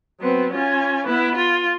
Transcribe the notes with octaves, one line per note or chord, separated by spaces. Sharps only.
F#3 B3 C4
C#4 F4 G#5
B3 E4 B4
F4